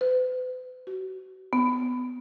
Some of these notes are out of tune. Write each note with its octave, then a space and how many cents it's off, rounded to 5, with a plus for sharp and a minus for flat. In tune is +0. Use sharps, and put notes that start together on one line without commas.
B4 +40
F#4 +30
B3 +20